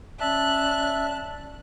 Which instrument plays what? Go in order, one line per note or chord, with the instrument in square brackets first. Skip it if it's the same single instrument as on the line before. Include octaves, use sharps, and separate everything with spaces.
[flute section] C#4 D5 [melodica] E5 [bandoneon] A5 [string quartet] F#6